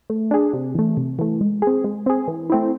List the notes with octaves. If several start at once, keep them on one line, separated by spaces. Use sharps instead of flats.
A3
D4 G#4
C3
E3 A3
C3
E3 A3
G#3
C4 G#4
G#3
C4 G#4
E3
A3 C4 E4